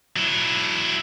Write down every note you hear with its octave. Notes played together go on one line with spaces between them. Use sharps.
F#3 E4